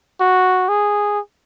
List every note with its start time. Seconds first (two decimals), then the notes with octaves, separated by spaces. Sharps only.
0.20 F#4
0.69 G#4